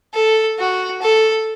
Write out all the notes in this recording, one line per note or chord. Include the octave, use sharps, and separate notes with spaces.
A4
F#4
A4